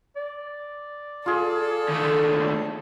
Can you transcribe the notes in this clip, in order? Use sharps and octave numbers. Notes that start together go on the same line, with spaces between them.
D5
F4 G#4 A4
D#2 A3